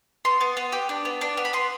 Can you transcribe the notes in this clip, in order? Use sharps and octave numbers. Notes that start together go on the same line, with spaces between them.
B3 C6
B3
B3
G4
D4
B3
D4
B3
B5
B3 C6